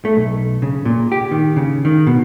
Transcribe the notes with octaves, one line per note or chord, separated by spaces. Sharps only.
A3
B1
C#3
A#2
G4
D#3
C#3
D#3
B2